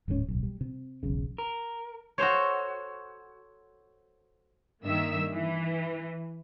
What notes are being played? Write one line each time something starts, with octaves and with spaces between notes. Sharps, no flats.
D1 G#2 G3 C#4
D1 B1
G3
C3
E1 B1 C#3
A#4
F#4 A4 C5 C#5
G2 D#3 A#3 E5 E6
E3